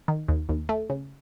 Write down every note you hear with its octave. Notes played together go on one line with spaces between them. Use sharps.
D#3
D#2
D#2
A3
C#3